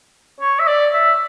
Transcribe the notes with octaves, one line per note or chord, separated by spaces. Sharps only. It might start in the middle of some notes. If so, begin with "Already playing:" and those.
C#5
E5
D5
E5